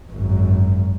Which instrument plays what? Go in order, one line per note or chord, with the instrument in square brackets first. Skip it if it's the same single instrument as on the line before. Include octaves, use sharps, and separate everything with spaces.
[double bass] G#1 F#2